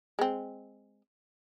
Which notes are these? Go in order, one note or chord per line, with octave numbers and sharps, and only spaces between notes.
G#3 C4